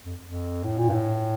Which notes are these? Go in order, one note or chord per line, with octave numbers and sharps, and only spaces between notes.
F2
F2
A2
A#2
G2
A2